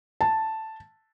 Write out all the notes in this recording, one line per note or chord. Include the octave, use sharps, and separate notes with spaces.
A5